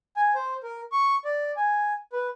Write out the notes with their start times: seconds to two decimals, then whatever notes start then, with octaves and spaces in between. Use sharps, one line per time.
0.17 G#5
0.35 C5
0.63 A#4
0.92 C#6
1.25 D5
1.57 G#5
2.13 B4